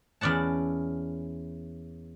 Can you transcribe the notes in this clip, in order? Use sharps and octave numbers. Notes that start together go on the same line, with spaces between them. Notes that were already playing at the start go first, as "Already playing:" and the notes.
E2 C#4 D5 F#5 A5